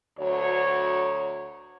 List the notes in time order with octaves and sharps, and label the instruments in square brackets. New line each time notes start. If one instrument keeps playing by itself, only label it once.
[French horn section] D2 F#3 C#5